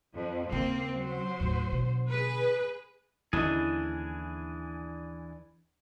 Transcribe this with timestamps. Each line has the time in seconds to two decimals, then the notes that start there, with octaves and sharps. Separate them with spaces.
0.16 F2
0.52 D#2 C#3 A#3 C4
0.97 F#3 C5
1.40 D#2 A2
1.72 B2 D3
2.08 G#4 B4
3.33 D#2 D3 E3 C#4 D4 E4 G#4 D#5